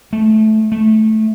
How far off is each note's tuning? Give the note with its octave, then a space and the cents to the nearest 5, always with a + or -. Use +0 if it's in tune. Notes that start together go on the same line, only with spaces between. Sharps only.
A3 -15
A3 -10